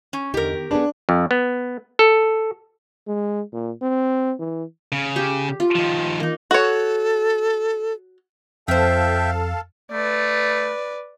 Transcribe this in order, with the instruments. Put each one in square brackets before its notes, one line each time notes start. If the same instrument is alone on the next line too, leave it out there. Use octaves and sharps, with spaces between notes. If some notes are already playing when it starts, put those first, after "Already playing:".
[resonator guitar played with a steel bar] C#4
[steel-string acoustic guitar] E2 D3 D#4 [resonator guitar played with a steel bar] G4 A#4
[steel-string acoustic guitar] D#3
[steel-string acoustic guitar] B3 G#4 B4 [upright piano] D4
[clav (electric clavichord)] F2
B3
A4
[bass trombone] G#3
A#2
C4
E3
[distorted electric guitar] C#3
[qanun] G4
F4
[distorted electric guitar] D#3 F3
[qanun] A#3 D#4
[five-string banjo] F#4 C#5 [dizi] A4
[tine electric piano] F2 [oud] F4 C5 [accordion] A4 F5 A5 [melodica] E5 G5
[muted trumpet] A3 [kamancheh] B4 D5